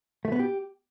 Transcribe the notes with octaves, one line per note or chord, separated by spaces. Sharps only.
A3
B3
G4